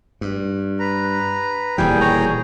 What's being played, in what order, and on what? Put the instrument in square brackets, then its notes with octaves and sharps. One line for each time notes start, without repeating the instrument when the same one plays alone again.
[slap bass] G2
[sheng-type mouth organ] B4 A#5
[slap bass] D#1 B2 E3 [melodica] G3 G5 [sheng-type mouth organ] G#4 G#5
[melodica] C#5 G5 A#5